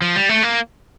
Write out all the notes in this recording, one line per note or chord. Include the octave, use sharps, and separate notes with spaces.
F3
G3
A3
A#3